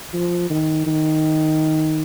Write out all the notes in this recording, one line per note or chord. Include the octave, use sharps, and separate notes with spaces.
F3
D#3
D#3